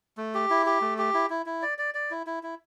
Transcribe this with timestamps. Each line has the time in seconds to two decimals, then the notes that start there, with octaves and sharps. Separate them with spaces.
0.17 A3
0.35 G4
0.50 E4
0.66 G4
0.82 A3
0.98 G4
1.14 E4
1.30 E4
1.46 E4
1.62 D5
1.78 D5
1.94 D5
2.11 E4
2.26 E4
2.43 E4